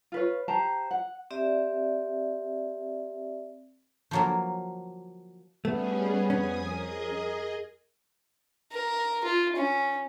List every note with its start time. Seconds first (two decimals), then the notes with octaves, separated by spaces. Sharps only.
0.12 F4 B4 C#5
0.48 G4 C5 A5 A#5
0.91 F#5
1.31 C4 G4 D5 E5
4.11 F3 F#3 A#3
5.65 G3 A3 B3 C#4 G#4
6.30 F2 C#4 G#5 D#6
6.70 G#4 A#4 D#5
8.72 A#4
9.25 F4
9.56 C#4